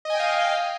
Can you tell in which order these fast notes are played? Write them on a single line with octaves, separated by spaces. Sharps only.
D#5 G#5 G5 F5